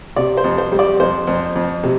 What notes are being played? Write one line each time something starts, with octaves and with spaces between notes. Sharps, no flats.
C3 D5
C5
F2
C5
G3
D5
F2 C5
F2
F2
C3